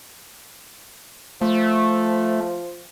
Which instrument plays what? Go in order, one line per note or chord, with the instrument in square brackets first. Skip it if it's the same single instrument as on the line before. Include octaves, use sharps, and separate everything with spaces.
[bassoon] F3 [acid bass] A3